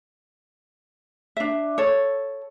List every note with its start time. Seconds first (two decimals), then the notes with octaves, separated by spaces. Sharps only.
1.37 D4 E5
1.78 A4 C#5